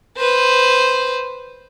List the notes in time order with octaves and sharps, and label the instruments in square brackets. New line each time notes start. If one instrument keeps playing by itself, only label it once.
[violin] B4 C5